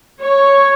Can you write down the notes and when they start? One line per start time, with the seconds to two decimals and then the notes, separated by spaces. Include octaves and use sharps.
0.22 C#5